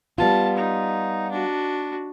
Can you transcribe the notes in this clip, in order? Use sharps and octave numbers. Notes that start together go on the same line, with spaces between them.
G3 B3 F4 A5
D#4
D4 F#4